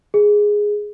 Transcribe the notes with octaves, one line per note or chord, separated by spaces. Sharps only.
G#4